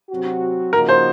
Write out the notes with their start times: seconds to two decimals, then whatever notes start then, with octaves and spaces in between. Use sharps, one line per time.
0.10 C3 F#3 C4 F#4
0.73 C#3 F3 A#3 D#4 F#4 A#4
0.89 C5